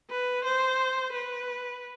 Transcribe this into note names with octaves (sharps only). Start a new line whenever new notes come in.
B4
C5
B4